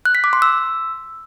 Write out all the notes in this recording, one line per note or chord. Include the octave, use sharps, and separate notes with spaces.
F#6
B6
D6
C6
E6